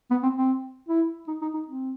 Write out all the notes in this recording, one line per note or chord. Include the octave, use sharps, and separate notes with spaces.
B3
C4
C4
E4
D#4
D#4
D#4
C4